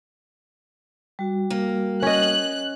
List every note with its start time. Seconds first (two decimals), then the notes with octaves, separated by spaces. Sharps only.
1.19 G3 F#4
1.50 A#3
2.03 C#4 D#5 F#6